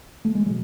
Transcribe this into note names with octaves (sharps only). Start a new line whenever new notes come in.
A3
G#3
B2 F#3